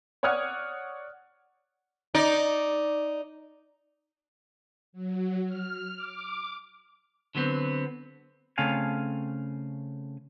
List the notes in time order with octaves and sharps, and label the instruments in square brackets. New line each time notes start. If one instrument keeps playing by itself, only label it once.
[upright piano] C#5 D5 F#5 D#6 F6 G#6
[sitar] D#4 D5
[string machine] F#3
F6
D6
[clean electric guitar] D3 F#3 B3 C4
[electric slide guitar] C#3 A3 C4 F5 G#5